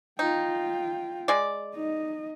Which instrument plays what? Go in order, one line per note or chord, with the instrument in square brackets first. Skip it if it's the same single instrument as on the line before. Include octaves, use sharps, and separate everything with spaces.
[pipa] D#4 [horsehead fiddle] F4 G5
[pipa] G#3 D5
[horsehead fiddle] D#4 D#5